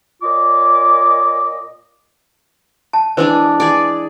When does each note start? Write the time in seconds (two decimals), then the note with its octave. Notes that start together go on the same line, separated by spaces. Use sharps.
0.23 A#2 F4 C#5 D#5 D6
2.93 A5
3.17 E3 G#3 D4 B4 C5 E6
3.60 G#4 D5